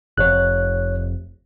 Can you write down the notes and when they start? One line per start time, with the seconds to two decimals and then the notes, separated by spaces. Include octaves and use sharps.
0.18 F1 C#5 F#6